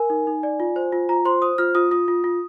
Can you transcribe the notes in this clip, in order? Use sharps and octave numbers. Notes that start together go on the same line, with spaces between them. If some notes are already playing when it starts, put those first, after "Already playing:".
Already playing: A#4 G#5
D#4
D#4
D5
F4
C5
F4
F4 A#5
C5 C6
C5 D#6
F4 F6
F4 D#6
F4 D#6
F4
F4